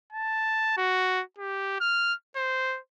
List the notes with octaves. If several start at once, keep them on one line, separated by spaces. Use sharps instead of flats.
A5
F#4
G4
F6
C5